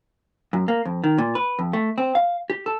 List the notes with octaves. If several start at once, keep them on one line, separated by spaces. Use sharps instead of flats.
F#2
A#3
F2
D#3
A#2
B4
F2
A3
C4
F5
G4
A4